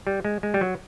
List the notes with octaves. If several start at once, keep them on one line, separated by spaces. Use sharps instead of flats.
G3
G#3
G#3
G3
F#3